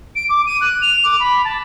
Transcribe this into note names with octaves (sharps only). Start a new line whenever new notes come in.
D7
D6
D#7
F#6
F7
D6
B5
A5